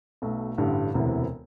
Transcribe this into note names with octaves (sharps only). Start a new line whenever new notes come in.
B1 B2 A3
A1 G2 D3 G3
E1 D2 C3 E3 B3